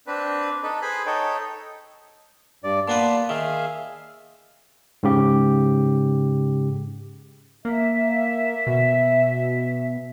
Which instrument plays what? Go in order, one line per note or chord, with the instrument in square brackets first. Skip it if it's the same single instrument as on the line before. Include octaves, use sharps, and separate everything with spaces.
[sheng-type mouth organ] C4 D4 B4
D#4 A4 B4
G#4 B4 C5 G#5 B5
D#4 A4 C#5 G5
[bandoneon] G2 D5
[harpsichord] A#2 B3 B4 [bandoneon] A5 C6
[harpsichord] D#3 [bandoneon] G#4 E5 F5
[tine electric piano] G#2 C#3 G4
[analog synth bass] A#3 [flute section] E5
[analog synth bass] B2